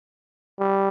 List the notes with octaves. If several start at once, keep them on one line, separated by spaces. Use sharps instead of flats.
G3